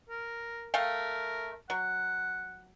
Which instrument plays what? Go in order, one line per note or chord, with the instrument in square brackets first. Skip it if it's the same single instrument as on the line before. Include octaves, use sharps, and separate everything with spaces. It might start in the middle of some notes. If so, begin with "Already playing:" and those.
[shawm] A#4
[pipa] A3 F5 G5 [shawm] A#4
[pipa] F#3 [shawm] F#5